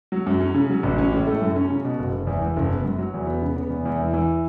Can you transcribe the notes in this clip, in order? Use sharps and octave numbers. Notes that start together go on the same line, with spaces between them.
F#3
F#2
C#4
C#3
F#3
A1
C#4
A2
A3
F#2
C#4
C#3
B2
F#1
F#1
E2
E3
F#1
B3
F#2
F#3
E2
B3
C#3
B3
E2
E2
E3
E3